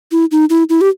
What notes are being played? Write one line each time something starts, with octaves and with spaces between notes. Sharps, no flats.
E4
D#4
E4
E4
G4